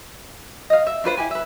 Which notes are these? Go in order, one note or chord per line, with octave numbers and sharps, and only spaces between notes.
D#5 F5
E5
D4 F4 B4 C5
E4 G4 G#5
B4 E5